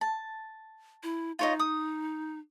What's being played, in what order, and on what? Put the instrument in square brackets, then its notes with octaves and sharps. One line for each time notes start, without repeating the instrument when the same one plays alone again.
[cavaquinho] A5
[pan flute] E4
[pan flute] D#4 [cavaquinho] F4 C#5 D#5
[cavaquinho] D#6